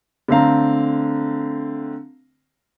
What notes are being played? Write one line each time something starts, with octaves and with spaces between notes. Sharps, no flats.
D3 A3 C4 F5 A#5